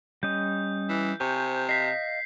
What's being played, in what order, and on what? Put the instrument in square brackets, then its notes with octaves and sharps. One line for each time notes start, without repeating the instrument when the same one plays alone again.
[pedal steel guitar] G3 C#4 D#5 [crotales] G6
[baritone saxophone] E3
[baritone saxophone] C3 [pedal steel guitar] C5 G#5 C#6
[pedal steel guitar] D#5 F5 [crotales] B6 C7